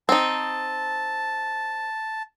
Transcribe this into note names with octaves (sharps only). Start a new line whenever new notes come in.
C4 D#4 A5